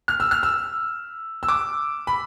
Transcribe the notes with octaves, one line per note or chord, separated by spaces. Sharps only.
F6
E6
F6
E6
E6
D6
B5